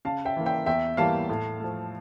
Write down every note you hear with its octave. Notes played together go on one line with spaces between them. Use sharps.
C#3 F5 A5
E5 G5
E3 A#3
E5 G5
E2 E5 G5
E3 G3 A#3 F5 A5
A2
F3 A3